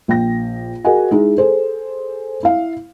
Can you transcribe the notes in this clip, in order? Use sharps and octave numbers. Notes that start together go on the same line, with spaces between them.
A#1 G5 A#6
F#4 G#4 A#4 D#5 F#5 G#5
G#3 D#4 E4
G#4 A4 C5
E4 F5